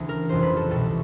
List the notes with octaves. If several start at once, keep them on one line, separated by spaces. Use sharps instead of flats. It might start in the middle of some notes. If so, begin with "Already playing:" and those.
Already playing: D2 C#3 E3
A#4
G1 F2 C3 E3 C5
B4
A4
C2 B2 A4